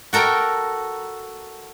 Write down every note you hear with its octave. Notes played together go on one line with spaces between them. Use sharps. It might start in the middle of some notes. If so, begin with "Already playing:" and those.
F#4 A4 A#4 G5 A#5